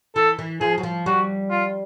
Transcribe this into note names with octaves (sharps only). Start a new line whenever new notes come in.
E3 A4
E3
F3 G#4
F#3
F3
G3 F#4
F4